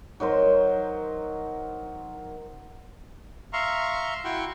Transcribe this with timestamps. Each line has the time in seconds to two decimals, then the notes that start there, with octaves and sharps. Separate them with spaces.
0.20 F#3 D#4 A#4 C5
3.53 E5 F5 A#5 C6 C#6
4.25 E4 F#4 F#5 G5 C6 C#6